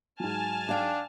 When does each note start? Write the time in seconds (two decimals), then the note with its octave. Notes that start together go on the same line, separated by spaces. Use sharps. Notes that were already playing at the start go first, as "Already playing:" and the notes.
0.20 G#2 F#3 G#5 A5 F6
0.69 D4 F5 G5